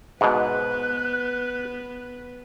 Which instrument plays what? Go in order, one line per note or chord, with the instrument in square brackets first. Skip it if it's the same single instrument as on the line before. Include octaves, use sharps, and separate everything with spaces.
[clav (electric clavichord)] G#2 B2 [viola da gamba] B3 B4 [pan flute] F#6